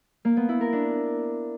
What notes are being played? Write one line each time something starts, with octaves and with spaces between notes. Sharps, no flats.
A#3
B3
E4
A#4
D4